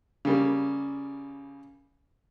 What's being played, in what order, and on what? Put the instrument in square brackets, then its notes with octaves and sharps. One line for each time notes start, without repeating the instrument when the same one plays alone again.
[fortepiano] C#3 G3 A#3